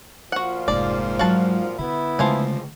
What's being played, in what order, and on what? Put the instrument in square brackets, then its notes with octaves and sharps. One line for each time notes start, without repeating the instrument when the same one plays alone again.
[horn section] A#2 F3 F4 [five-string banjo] F#4 F#5
[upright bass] F1 A#3 [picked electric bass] G#2 [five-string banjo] D5
[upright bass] F#3 G#3 [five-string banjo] F#4 F5 A5
[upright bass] D3 [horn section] B3 E4
[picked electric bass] C#3 G#3 A3 [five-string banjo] F3 F4 G#5